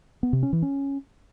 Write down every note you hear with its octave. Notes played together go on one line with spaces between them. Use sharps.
B3
C3
C#4
E3
C#4